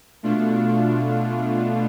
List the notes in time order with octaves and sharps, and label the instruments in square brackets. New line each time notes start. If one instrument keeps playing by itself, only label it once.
[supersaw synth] B2 A3 D4 F4